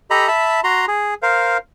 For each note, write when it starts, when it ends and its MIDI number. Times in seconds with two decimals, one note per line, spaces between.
0.10 0.28 67
0.10 0.28 69
0.10 0.28 75
0.10 0.28 82
0.10 0.28 83
0.28 0.60 76
0.28 0.60 81
0.28 0.60 83
0.64 0.86 66
0.64 0.86 82
0.64 0.86 84
0.88 1.14 68
1.22 1.57 70
1.22 1.57 72
1.22 1.57 77